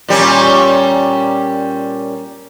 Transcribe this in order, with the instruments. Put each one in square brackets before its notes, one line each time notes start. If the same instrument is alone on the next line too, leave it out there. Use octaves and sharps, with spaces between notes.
[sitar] A#2 G3 C#4